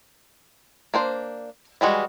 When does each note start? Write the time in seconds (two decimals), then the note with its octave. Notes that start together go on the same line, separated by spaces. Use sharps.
0.94 A#3 D4 C5
1.81 E3 G3 G#3 F#4